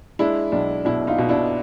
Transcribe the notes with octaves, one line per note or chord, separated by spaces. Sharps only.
G#3 D4 E4
B1 D4
B2 D4 E4
D#4 F4
B2
D4 E4